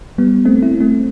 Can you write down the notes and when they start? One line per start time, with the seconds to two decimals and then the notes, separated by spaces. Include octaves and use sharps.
0.18 G3 B3
0.45 A3 C4
0.63 C4 E4
0.81 A3 C4